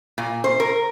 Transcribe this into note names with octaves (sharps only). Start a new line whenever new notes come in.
A#2
C5
A#4